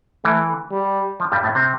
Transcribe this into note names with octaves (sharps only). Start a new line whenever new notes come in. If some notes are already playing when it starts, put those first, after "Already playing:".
E3 A3
G3
F3
G2 G3
A2 A3
C3 C4